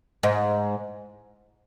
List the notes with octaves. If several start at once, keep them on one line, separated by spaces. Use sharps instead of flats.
G#2